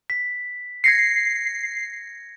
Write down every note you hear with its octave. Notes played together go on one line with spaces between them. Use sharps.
B6
G#6 A#6 C7 C#7